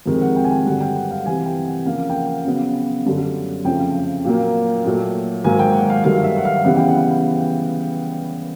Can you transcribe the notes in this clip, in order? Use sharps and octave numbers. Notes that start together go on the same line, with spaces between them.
F2 C3 D#3 G#3
F#5
G5
G#5
G5
G2 D3 F#3 F#5
G5
F#5
F5
C3 E3 G3 G#5
G5
F#5
C#3 F3 A#3 F5
G5
F#5
C#3 F#3 B3
F#2 D3 G3
F2 C#3 F3 A3 G5
A#2 F#3 A#3
A#2 F#3 A3
G#2 D#3 F#3 A#3 G#5
G5
F#5
F5
G2 D#3 F#3 A3 F5
E5
F#5
F5
C#3 E3 G3 B3 F#5
G5
F#5